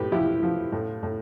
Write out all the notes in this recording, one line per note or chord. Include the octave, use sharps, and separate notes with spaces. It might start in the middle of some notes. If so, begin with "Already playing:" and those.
Already playing: A2 G4 B4
F3 E4 G4
F3
A2
A2